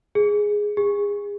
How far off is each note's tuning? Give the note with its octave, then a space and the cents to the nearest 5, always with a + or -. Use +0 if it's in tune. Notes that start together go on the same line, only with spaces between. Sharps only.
G#4 +0
G#4 -25